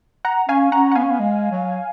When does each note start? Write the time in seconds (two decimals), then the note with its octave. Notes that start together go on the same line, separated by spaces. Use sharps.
0.25 F#5 A#5
0.49 C#4 F5 G#5
0.72 C#4 F#5 A#5
0.92 F#5
0.95 B3 F5 G#5
1.04 C#4
1.11 B3
1.19 G#3
1.51 F#3